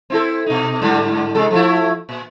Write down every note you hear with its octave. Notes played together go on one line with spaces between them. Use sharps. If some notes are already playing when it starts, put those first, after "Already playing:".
C4 E4 A4
B2 D#4
G#2 D3 G3
C3 G#3 A4
F3 A3 E4
A#2